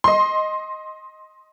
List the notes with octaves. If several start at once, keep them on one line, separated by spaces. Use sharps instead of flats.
D#5 C6